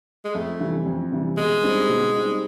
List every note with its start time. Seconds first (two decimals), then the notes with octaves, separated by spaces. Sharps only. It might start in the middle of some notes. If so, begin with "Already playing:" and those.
0.25 G#3
0.35 F2 A3
0.60 C3 E3 G3
0.86 F2
1.12 C3 E3 G3
1.37 B2 G#3
1.63 G3 C4 D#4
1.89 B2
2.14 G3 C4 D#4